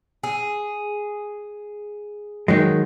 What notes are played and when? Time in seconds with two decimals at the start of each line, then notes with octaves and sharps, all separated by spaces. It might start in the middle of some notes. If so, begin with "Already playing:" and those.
0.23 G#4
2.48 D#3 F#3 G#3